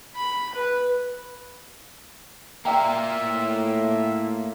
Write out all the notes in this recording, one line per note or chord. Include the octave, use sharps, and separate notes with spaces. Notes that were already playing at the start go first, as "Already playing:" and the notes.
B5
B4
A#3 F4 D5 E5 G5 A#5
A2